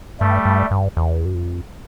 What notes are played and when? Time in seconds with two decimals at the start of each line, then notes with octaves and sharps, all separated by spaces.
0.20 G2 G3 A3
0.45 G2
0.71 G2
0.97 E2
1.25 F#2
1.35 F2